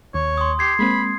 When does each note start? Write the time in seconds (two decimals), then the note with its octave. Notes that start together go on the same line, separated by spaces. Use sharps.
0.14 D#2 C#5
0.37 C6 D#6
0.59 G4 G#6 C7
0.79 G#3 A#3 C4 B5